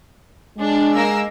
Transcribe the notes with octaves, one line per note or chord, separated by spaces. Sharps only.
G#3 D4
A#3 A#4 E6